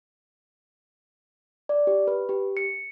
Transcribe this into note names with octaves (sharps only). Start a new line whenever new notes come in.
D5
G4
B4
G4
C#7